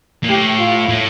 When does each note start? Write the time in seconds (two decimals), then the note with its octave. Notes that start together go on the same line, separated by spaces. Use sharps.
0.24 A#2
0.29 A2 G4
0.59 F4
0.89 A2